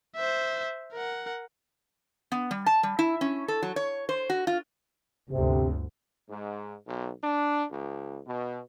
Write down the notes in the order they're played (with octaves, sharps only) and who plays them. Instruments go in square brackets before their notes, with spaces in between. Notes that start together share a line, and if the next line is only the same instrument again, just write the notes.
[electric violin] C5 E5
A#4 F#5
[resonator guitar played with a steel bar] B3
G3
A5
G3
E4
C#4
A4
F#3
C#5
C5
F#4
F4
[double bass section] G1 D2 [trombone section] C3
[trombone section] G#2
B1
D4
C#2
B2